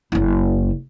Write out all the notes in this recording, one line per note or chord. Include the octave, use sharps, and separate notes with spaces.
F#1 E4